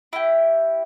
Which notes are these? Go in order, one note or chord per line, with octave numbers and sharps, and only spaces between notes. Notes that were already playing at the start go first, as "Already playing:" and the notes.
E4 G4